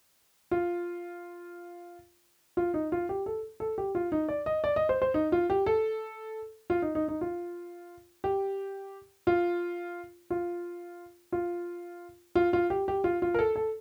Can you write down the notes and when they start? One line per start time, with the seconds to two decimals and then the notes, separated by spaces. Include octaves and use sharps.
0.51 F4
2.57 F4
2.74 D#4
2.92 F4
3.09 G4
3.26 A4
3.60 A4
3.78 G4
3.95 F4
4.12 D#4
4.29 D5
4.46 D#5
4.64 D5
4.76 D#5
4.89 C5
5.02 C5
5.14 D#4
5.32 F4
5.50 G4
5.66 A4
6.70 F4
6.82 D#4
6.95 D#4
7.08 D#4
7.21 F4
8.24 G4
9.27 F4
10.30 F4
11.32 F4
12.35 F4
12.53 F4
12.70 G4
12.88 G4
13.04 F4
13.22 F4
13.34 A#4
13.39 A4
13.56 A4